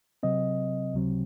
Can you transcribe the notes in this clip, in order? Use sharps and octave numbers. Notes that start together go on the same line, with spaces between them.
C3 F#3 C4 D#5
C#2 C3 F#3 C4